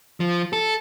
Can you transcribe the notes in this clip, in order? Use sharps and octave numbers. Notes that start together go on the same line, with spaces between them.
F3
A4